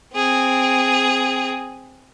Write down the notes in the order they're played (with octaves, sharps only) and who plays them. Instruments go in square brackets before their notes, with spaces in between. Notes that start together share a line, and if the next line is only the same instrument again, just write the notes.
[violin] C4 G#4